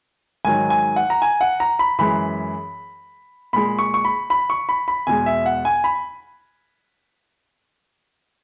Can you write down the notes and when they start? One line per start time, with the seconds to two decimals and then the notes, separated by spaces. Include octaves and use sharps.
0.45 G#2 D#3 F#3 G#5
0.70 G#5
0.96 F#5
1.10 A#5
1.22 G#5
1.41 F#5
1.60 A#5
1.79 B5
1.99 F#2 E3 G#3 B5
3.53 A#2 G#3 B5
3.79 C#6
3.94 C#6
4.05 B5
4.30 B5
4.50 C#6
4.69 B5
4.88 B5
5.07 E2 B2 G#3 G#5
5.26 E5
5.46 F#5
5.65 G#5
5.84 B5